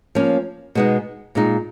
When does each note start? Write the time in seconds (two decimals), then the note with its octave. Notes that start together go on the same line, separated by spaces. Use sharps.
0.15 F3 A#3 C#4
0.75 B2 G#3 B3 D#4
1.35 A#2 G#3 D#4